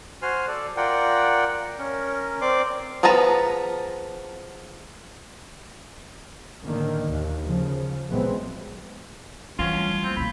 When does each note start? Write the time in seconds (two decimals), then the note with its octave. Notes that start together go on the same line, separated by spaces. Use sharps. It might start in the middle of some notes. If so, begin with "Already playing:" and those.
0.22 F#4 C5 G#5 C6 F6
0.47 A4 D5
0.77 F4 A#4 D5 F#5 G5
1.78 C#4 A#4
2.41 C4 D5 C6 D6
3.03 F3 B3 G#4 A5 A#5
6.64 A2 D3 D#3 A#3
7.08 D#2
7.45 C#3 F3
8.09 A1 A#2 F#3 G#3 B3 C4
9.59 E2 E3 F#3 G3 C#4 F4
9.73 F#3 G3 A3
10.04 A#3 C4
10.16 B2 E4 B5